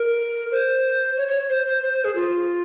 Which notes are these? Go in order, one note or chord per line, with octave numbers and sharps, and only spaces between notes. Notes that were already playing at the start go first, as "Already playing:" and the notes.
Already playing: A#4
C5
C#5
C#5
C5
C5
C5
C5
G#4
F4